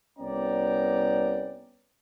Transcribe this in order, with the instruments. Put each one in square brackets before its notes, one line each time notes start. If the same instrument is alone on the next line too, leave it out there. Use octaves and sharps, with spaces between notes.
[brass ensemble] C2 B3 C#4 D5 G5 A#5